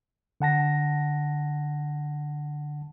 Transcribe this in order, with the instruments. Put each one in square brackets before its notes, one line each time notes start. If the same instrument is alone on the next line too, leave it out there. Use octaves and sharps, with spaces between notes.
[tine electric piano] D3 F#5 A5 A#6